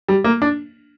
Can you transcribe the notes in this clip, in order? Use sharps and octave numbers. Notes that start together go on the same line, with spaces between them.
G3
A#3
D4